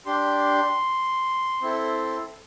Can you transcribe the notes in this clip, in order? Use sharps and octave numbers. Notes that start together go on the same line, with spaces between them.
D4 G4 C6
C4 E4 A4